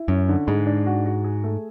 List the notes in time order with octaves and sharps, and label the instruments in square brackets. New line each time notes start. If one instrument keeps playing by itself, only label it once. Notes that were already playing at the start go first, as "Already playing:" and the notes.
Already playing: [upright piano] E4
[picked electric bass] F#2 [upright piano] C#4
[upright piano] D3
[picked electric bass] G#2 [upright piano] G#3
[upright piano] D4
F#4
F#4
G#4
A3